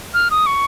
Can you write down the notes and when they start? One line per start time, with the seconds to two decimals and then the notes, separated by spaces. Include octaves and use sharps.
0.14 F6
0.31 D#6
0.46 C#6